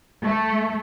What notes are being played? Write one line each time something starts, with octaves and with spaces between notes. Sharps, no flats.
A3